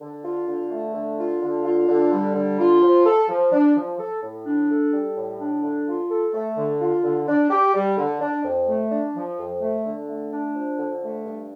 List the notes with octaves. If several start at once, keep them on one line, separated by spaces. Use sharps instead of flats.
D3
F4
D3
A3
D3
F4
D3
F4
D3
G3
D3
F4
F3
A4
F3
D4
F3
A4
A2
D4
A4
G3
A2
D4
D3
F4
A4
A3
D3
F4
D3
D4
G4
G3
D3
D4
F2
A3
D4
F3
F2
A3
D3
A3
D4
F3
D3
A3
G2